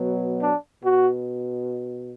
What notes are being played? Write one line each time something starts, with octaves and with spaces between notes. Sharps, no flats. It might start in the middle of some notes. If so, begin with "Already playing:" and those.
Already playing: B2 F#3 B3
D4
B2 F#4